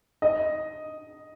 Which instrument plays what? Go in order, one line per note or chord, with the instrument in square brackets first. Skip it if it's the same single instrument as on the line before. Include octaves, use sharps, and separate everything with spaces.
[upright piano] D#5